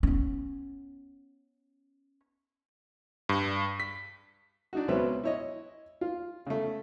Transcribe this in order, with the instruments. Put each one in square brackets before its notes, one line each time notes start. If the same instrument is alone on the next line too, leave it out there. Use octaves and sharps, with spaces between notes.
[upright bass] B3 C#4
[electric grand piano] G2
B6
[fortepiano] D4 D#4 F#4
C#2 B2 F#3 C4 B4 E5
E4 C#5 D#5
F4
C#3 A3